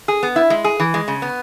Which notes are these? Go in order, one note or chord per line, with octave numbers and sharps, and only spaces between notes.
G#4
B3
E4
G#3
G#4
E3
G#3
C#3
B3